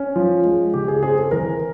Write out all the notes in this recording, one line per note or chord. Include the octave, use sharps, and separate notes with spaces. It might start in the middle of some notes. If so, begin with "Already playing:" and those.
Already playing: C#4
F3
G#3
C#3 G4
G#4
C4 G#4
A4
E3 A#4